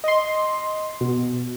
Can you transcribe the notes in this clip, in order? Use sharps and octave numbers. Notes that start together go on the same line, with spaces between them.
D#5 C6
B2